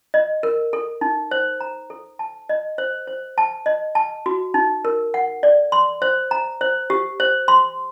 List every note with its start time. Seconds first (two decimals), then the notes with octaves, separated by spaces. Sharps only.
0.14 D#5
0.43 A#4
0.73 A4
1.01 D#4
1.31 C5
1.60 A#5
1.90 A4
2.19 A5
2.49 D#5
2.78 C5
3.07 C5
3.38 A5
3.66 D#5
3.95 A5
4.26 F#4
4.54 D#4
4.85 A#4
5.14 F#5
5.43 D5
5.72 C6
6.02 C5
6.31 A#5
6.61 C5
6.90 G4
7.20 C5
7.48 C6